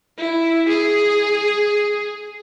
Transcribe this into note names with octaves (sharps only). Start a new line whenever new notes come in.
E4
G#4